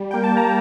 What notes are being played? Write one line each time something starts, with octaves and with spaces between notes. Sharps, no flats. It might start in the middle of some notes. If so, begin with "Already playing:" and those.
Already playing: G3
A#3 G5
A5
A#5